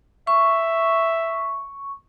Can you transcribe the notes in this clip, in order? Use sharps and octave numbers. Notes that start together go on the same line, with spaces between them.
E5 C#6